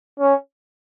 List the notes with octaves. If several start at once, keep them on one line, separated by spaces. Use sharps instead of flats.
C#4